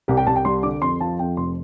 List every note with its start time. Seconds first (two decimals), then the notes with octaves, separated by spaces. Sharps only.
0.08 C2 G4
0.17 G5
0.27 C2 A5
0.36 G5
0.45 G3 C6
0.63 D3 D6
0.82 F2 C6
1.01 F3 A5
1.19 F2 G5
1.37 F1 C6